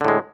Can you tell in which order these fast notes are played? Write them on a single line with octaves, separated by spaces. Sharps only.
D3 A2 G#3